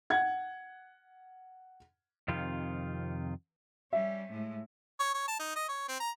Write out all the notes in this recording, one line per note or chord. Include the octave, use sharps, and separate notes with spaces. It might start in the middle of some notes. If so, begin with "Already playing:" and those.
F#5 G#6
F2 C3 D#3 F4
G3 C#4 E5
A2 G#3
C#5
C#5
A5
D#4
D#5
C#5
C4
A#5